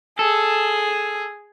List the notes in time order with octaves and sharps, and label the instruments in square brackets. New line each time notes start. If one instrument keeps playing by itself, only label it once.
[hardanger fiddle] G#4 [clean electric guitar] A4